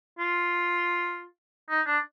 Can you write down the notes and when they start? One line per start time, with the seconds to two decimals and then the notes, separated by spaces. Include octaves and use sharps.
0.19 F4
1.70 D#4
1.87 D4